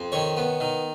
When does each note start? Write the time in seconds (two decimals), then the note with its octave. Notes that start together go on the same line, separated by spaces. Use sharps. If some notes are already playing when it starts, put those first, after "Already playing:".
Already playing: F2
0.12 D#3 C#5
0.37 B3
0.60 D#3